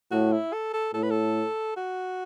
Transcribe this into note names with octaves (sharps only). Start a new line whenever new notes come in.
A2 F#4
E4
A4
A4
A2 A4
B4
A4
F#4